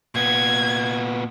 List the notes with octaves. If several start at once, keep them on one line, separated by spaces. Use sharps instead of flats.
A#2 B3 G#6